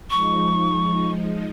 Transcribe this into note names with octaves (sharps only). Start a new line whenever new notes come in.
F3 G#3 D#4 C#6